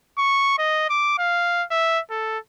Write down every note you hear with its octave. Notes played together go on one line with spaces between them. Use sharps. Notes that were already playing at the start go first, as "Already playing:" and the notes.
C#6
D#5
D6
F5
E5
A4